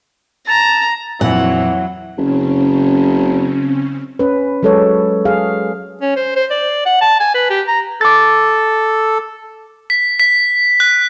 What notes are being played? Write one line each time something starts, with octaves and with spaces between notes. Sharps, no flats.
A5 A#5
F2 A#2 E3 F#3 F#5
F#1 C#3 C4 C#4
C#4 B4
F#3 G#3 A4 B4 C#5
G#4 F5
C#4
C5
C5
D5
F#5
A5
G#5
B4
G4
A#5
A4 D6 A6
B6
B6
F#6